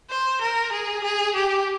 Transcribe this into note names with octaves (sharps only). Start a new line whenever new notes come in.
C5
A#4
G#4
G#4
G4